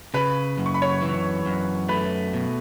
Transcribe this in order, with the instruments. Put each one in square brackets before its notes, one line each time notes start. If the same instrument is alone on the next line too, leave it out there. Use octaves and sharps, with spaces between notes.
[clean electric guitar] C#3 [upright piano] B4 B5
[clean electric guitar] F#2
[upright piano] C#6
B5
C#5 C#6
[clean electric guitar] E3
F#2
[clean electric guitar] A3 [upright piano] B4 B5
[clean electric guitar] B2